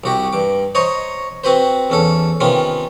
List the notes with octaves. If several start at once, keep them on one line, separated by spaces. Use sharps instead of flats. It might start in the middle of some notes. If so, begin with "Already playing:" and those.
C2 F#4 G4
G2 D6
C5 C#5 D#5 A#5 C#6
C4 F#4 B4 C5
E2 C#4 A4
C3 D#3 B3 C#4 F4